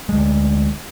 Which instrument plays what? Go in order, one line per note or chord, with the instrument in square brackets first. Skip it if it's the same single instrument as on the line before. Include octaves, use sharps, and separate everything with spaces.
[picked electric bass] D2 G#3